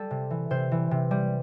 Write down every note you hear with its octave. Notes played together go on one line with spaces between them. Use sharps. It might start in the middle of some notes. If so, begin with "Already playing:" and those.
Already playing: G3 A4
C3
E3
C3 C5
E3
C3
G3